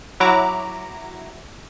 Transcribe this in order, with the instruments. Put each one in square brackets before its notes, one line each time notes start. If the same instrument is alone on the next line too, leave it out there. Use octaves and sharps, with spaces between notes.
[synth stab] F#3 E4 F#4 A#5 D6